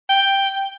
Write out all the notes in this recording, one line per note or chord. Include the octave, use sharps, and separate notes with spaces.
G5